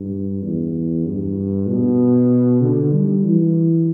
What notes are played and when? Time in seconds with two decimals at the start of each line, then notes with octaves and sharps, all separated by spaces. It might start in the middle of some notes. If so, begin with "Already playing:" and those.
Already playing: G2
0.43 E2
1.06 G2
1.68 B2
2.62 D3
2.93 G3
3.24 E3